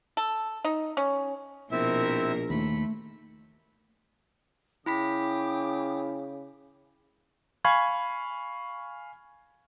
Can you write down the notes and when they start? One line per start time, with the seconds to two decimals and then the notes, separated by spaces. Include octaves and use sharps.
0.17 A4
0.65 D#4
0.97 C#4
1.72 A#1 B2 C4 E4 A#4 E5
2.50 D#2 A3 B5
4.86 C#3 E4 G5 B5 D6 D#6 B6
7.65 F5 G#5 B5 C#6 G#6